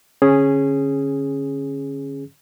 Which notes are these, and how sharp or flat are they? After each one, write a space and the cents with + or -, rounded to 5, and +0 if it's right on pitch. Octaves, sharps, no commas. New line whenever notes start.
D3 +0 C#4 -15 G#4 +0